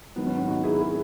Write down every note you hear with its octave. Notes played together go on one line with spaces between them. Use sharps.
G#2 D#3 F#3 B3
C#4
B3
D#4 F#4
E4 G#4
E4 G#4